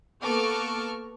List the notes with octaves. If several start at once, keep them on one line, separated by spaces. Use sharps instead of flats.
A#3 B3 A4 C#6 D6 F6